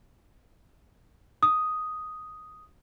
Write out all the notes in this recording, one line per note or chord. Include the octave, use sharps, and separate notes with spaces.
D#6